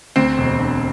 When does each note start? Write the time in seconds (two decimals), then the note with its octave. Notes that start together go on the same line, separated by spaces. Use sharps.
0.16 D2 C4
0.38 E1
0.58 D3